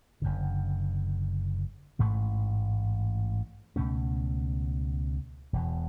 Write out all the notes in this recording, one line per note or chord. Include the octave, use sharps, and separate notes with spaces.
F#1 F#2 D3
A1 G#2 E3 A3
C#2 B2 A3 C#4
E1 E2 B2